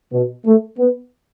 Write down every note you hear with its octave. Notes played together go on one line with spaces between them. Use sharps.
B2
A3
B3